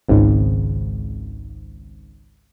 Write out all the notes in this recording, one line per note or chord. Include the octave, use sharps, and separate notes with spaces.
G#1 C#2 G#2